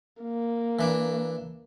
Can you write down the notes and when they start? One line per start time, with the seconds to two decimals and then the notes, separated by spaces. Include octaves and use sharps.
0.23 A#3
0.79 E3 D4